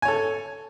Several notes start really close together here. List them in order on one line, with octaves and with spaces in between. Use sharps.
G#5 C#5 A4